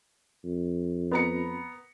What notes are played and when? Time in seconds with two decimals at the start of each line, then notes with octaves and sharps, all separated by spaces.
0.44 F2
1.11 B3 A#5 C#7